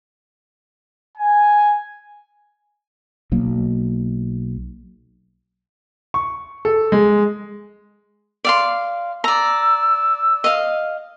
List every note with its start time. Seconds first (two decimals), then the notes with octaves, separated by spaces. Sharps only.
1.17 G#5
3.32 B1 F#3 A#3
6.14 C#6
6.65 A4
6.92 G#3
8.45 D5 F5 C6
9.24 D5 A#5 E6
10.44 D#5 F5